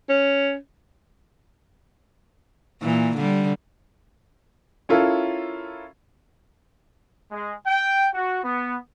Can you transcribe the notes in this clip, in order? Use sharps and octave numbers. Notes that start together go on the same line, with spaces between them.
C#4
A#2 E3
D3 G3
C#4 E4 F4 A4 A#4
G#3
G5
F#4
B3